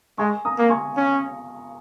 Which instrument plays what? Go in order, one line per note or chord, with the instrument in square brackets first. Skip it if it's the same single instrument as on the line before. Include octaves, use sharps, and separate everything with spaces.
[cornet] G#3 [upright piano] G#5 C#6
[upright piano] A#5 D#6
[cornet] A#3
[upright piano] G#5 C#6
[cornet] C#4